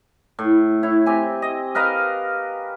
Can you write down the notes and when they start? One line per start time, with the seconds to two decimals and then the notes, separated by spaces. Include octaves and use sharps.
0.39 A2
0.83 E4 C#5
1.06 C4 G4 G#5
1.42 D#5
1.75 A#4 B4 D#5 F5